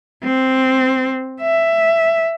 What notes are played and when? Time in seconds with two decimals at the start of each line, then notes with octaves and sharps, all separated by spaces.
0.24 C4
1.42 E5